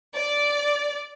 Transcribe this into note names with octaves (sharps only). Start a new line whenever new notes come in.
D5